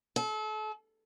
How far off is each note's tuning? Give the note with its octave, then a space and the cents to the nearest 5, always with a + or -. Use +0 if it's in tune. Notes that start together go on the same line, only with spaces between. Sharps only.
A4 -35